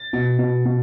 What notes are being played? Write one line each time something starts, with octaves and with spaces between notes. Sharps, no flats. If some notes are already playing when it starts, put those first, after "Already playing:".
Already playing: A6
B2
B2
B2